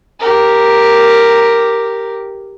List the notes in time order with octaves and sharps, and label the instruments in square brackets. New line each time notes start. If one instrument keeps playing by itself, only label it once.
[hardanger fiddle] G4 A#4